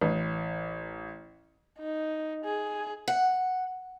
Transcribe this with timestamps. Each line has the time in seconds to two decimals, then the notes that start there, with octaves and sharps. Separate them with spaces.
0.01 A1
1.79 D#4
2.44 G#4
3.08 F#5